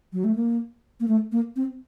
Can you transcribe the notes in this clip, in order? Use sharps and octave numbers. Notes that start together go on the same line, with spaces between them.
F#3
A3
A#3
A#3
A3
A#3
C4